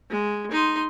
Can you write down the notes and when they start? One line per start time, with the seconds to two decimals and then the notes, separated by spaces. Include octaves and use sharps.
0.10 G#3
0.51 D#4 C6